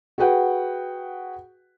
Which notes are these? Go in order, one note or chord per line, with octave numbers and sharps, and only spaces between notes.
F#4 G#4 B4 F#5 G5